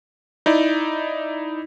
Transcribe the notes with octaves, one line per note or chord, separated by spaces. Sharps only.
D#4 E4 D5